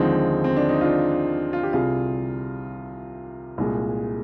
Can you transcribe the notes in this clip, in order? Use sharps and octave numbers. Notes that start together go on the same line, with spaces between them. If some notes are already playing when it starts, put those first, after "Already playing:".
Already playing: D#2 D3 F3 G#3 C4 D#4
C4
D4
D#4
D4 F4
F4
G4
C2 C3 G3 F4 G#4
C2 A#2 G#3